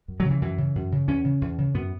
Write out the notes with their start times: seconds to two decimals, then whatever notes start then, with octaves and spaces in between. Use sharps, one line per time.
0.08 F#2
0.20 F#3
0.25 C#3
0.31 E3
0.41 F#2 E3
0.58 C#3
0.75 F#2
0.92 C#3
1.08 E2 C#4
1.24 C#3
1.41 E2
1.58 C#3
1.74 F#2 B3